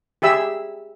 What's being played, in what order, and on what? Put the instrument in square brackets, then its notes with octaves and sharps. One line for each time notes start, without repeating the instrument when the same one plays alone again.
[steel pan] G4 G#4 E5 E6